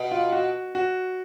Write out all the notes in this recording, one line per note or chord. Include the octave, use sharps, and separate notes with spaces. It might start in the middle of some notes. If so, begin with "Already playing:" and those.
Already playing: B2
F4
F#4
F#4